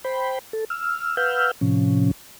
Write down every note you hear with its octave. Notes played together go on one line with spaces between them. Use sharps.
C5 G5 B5
A4
E6 F6
B4 F5 F#5 E6 F6 G6
A2 C3 F3 C#4